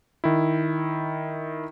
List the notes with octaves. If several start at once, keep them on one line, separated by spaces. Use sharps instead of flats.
D#3 E4